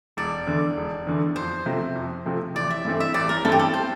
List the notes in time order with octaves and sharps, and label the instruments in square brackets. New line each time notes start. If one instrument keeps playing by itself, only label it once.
[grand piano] E1 [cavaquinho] D5
[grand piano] E2 D3
E1
E2 D3
[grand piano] F2 [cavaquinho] C5
[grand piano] C3 F3 A3 C4
F2
C3 F3 A3 C4
[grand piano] A1 [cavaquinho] D5
[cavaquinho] E5
[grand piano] G2 E3 A3 C4
[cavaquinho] E5
[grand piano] A1 [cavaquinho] D5
[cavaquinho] A#4
[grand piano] G2 E3 A3 C4 [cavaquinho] A4
[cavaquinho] G4
A4
C5